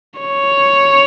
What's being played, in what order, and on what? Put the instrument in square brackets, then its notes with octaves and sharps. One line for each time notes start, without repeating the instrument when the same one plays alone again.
[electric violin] C#5